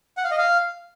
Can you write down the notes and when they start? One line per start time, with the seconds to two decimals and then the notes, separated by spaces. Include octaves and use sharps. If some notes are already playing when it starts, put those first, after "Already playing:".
0.17 F#5
0.24 F5
0.31 D#5
0.38 F5